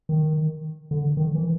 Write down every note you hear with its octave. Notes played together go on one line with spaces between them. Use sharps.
D#3
D3
D#3
E3